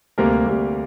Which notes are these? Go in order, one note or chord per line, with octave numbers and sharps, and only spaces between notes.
D2 C3 G3 A#3 A#4
D2 C3 G3 A#3